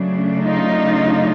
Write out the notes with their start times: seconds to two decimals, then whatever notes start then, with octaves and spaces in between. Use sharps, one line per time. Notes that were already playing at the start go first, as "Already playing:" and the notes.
Already playing: C#3 F#3 A3 D4
0.43 D#4 F4